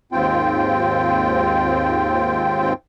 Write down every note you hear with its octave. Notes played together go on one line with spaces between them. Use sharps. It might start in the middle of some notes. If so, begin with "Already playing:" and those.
D#2 G#2 C4 F4 G5